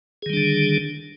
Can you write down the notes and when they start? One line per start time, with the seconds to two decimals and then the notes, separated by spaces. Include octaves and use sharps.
0.22 G#4
0.26 D#3
0.30 G3
0.33 D4
0.37 D3